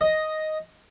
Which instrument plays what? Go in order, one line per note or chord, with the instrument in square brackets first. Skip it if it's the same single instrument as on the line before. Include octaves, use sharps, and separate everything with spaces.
[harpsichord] D#5